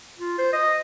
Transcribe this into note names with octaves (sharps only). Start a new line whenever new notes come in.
F4
C5
D#5